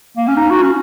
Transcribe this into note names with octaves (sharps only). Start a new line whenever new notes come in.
A#3
C#4
D#4
F#4
C#4